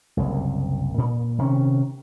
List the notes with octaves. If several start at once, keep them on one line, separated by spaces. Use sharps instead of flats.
F#1 C2
A#2
C3 D#3 C#4